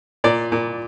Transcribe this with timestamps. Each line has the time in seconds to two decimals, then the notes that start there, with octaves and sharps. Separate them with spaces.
0.24 A#2 D5
0.52 A#2